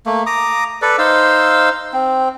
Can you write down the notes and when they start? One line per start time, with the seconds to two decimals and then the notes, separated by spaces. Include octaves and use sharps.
0.06 A3 A#3
0.26 A#5 D6 D#6
0.82 A4 B4 D5
0.98 D#4 C5 F5 E6
1.93 C4